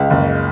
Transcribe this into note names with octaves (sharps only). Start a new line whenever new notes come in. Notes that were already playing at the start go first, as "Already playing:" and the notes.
Already playing: C#2
F#1